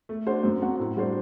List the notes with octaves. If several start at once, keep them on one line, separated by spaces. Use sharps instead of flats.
A3
D4 F#4 C5
F#2
F#3 C4 F#4
A2
G3 D4 F#4 C5